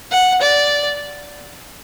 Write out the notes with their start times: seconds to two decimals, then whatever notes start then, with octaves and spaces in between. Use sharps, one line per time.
0.11 F#5
0.42 D5